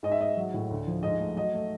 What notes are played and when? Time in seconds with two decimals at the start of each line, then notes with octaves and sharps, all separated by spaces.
0.03 G#2 D#5
0.12 E5
0.20 G#2 D#5
0.37 F#3
0.54 A2
0.71 D2
0.87 F3
1.03 G#2 D#5
1.20 A3
1.36 F#3 D#5
1.54 A3